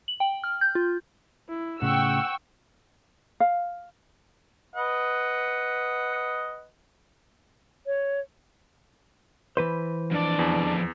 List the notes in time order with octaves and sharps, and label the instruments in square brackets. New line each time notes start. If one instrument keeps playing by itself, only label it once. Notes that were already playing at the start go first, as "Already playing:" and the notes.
[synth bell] F#7
G5
F6
G6
F4
[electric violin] E4
[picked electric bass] A2 C#3 [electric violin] F#5 [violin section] G5 C#6 E6
[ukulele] F5
[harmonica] B4 D#5 F#5
[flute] C#5
[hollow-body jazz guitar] E3 B4 C5
[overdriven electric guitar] F2 D5 [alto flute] D4
[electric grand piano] E2